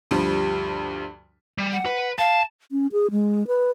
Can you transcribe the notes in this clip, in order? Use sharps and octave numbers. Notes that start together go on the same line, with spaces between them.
D2 G2 F3 G3
G3
F#5
B4
F5 A5
C#4
G#4
G#3
B4